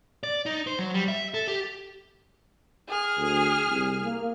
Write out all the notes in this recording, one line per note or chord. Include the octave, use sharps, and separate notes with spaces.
D5
D#4
C5
F#3
G3
E5
A4
G4
G#4 F6
D2
C2
A#3